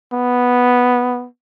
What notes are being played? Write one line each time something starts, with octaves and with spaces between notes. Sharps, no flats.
B3